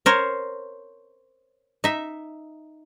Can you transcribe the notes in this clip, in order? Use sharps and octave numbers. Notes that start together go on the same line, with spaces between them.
A#4 C5 C#5
D#4 E5